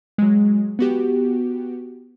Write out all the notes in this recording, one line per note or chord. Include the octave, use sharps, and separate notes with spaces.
F#3 G#3
B3 F#4 G4